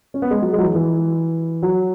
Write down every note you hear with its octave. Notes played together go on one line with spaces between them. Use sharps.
C#4
B3
G#3
F#3
G#3
F#3
E3
E3
F#3